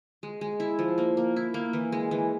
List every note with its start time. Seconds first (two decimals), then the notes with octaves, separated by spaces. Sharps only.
0.23 G#3
0.41 G#3
0.60 E4
0.79 F3
0.98 A#3
1.17 A#3
1.36 E4
1.54 A#3
1.73 E3
1.92 G#3
2.11 E3